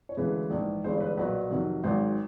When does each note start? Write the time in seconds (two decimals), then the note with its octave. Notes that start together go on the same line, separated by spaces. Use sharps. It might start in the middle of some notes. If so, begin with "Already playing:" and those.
0.09 C#5
0.17 D2 C#3 E3 G#3 B4
0.50 A#1 G#2 E3
0.84 G1 G2 E3 G#3 C5
1.00 B4
1.17 B1 A#2 F#3 B4
1.50 F2 C3 D#3 F#3
1.84 G#1 G#2 D#3 F#3 C5